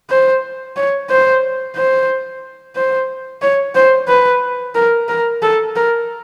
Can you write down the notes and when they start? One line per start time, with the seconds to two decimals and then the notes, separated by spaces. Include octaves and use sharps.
0.10 C5
0.76 C#5
1.10 C5
1.76 C5
2.76 C5
3.42 C#5
3.75 C5
4.08 B4
4.75 A#4
5.08 A#4
5.42 A4
5.76 A#4